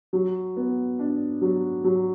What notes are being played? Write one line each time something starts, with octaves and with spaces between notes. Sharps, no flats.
F#3
B3
D4
F#3
F#3